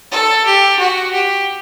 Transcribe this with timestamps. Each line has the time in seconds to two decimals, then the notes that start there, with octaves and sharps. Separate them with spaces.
0.12 A4
0.46 G4
0.79 F#4
1.13 G4